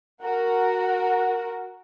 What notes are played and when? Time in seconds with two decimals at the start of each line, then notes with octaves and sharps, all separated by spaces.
0.22 F#4 A#4 F#5